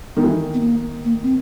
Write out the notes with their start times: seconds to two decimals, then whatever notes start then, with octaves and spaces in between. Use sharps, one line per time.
0.17 D#3 B3
0.23 E3
0.31 D#3
0.54 B3
0.60 A#3
1.05 A#3
1.23 C4